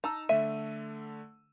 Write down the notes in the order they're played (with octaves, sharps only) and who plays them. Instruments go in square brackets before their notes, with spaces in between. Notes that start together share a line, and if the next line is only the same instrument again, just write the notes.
[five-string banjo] D#4 [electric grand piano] A5 A#5 E6
[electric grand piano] D3 A3 D#7 [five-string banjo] E5